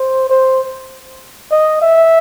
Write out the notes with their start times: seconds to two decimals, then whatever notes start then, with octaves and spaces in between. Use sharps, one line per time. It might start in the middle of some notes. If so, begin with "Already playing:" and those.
Already playing: C5
0.29 C5
1.51 D#5
1.82 E5